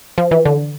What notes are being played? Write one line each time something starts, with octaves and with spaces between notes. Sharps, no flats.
F3
E3
D3